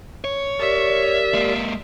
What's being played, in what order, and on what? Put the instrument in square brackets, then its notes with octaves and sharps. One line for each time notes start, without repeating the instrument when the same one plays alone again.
[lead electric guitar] C#5
[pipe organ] G4 A#4 D5 [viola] E5
[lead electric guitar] G#3 A#3